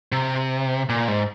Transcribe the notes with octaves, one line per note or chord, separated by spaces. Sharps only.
C3
A#2
G#2